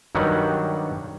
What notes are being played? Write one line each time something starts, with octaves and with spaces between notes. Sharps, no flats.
G2 D#3 F#3 G3 F#5